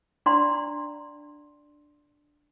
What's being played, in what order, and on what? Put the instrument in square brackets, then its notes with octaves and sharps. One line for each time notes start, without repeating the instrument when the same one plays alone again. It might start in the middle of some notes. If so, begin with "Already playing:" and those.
[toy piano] D4 F4 D5 F#5 A#5 C6